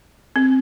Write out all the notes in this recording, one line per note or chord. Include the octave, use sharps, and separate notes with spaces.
C4